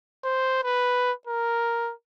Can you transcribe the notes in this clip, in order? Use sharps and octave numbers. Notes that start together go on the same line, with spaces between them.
C5
B4
A#4